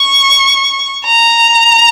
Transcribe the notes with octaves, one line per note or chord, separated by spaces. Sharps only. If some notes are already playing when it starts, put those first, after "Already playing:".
Already playing: C#6
A#5